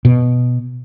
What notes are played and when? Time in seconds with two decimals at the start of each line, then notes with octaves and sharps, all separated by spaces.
0.05 B2